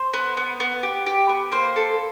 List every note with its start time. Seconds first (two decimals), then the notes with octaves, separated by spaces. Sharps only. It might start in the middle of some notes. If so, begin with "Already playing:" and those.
Already playing: C5
0.14 B3
0.37 B3
0.60 B3
0.83 G4
1.06 G4
1.29 B3
1.52 A#3 C5
1.76 A4